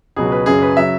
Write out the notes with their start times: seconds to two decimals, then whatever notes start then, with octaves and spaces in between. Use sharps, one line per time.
0.16 C#2 B2 F#3 G#4
0.32 B4
0.46 F#2 C#3 F#3 G#4
0.62 B4
0.77 C#3 F#3 E5